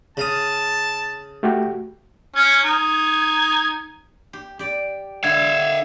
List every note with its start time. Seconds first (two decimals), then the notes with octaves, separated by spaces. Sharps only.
0.17 C#3 F5 A5 D#6
1.43 A3 F#4 G4
2.36 C#4 G#6
2.64 D#4
4.33 G4
4.59 G4 D5
5.24 D3 E5 F5 G#6